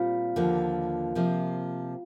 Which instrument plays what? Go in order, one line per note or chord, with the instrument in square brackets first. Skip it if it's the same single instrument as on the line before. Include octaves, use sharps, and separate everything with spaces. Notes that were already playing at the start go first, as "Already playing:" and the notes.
Already playing: [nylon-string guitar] A#2 G3 C4 [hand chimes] F4 F5
[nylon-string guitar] D#2 D3 F3 A#3
C3 F3 A#3